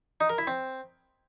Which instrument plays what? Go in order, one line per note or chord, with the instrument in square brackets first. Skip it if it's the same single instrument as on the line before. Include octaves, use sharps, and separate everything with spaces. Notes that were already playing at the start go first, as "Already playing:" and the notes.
[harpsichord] D#4
A#4
E4
C4